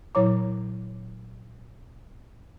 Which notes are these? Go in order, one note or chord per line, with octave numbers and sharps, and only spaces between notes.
A#2 F#3 E4 C#5 A#5 D6